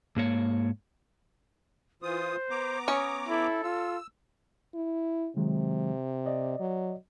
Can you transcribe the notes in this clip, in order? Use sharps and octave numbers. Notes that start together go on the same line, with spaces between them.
G#2 A#3 C#5
E3 F4 C5 D#6
B3 A#5 D6
C#4 C#5 D#6
E4 A4
F4 E6
E4
C3 D#3 F#3 G#3
D5 D#5
F#3